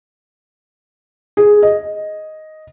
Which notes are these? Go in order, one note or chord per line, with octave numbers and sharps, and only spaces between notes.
G#4
D#5